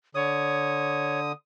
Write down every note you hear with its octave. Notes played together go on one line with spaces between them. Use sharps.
D3 C#5 D#6